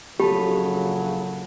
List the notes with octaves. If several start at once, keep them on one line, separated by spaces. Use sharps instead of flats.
A#1 C#3 F#3 G4 A4 A5 B5